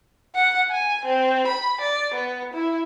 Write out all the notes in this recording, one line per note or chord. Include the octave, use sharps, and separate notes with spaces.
F#5
G#5
C4
B5
D5
B3
E4